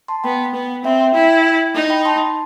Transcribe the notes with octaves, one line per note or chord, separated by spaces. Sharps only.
A5 C6
B3 G5 B5
B3
C4 E5 G5
E5 G5
E4 G5 B5
D#4
G5 B5
A5 C6